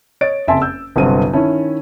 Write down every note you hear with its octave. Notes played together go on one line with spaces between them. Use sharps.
C#5 D#5 A6 D7
F#1 F2 E5 G#5 A5 C6
E6 G6
G1 C2 G2 F#3 C4 D#7
D#3 C#4 E4 A5